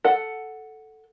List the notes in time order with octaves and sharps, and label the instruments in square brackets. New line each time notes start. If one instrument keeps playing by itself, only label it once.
[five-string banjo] A4 F#5